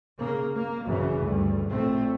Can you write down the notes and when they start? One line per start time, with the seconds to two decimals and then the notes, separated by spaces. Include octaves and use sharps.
0.17 C#3 A#3
0.54 A#3
0.85 A#1 F#2 C#3 E3
1.19 D2 G2
1.70 A#1 A2 A3 C4